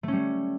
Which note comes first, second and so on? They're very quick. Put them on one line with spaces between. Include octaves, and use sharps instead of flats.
A3 C#4 G3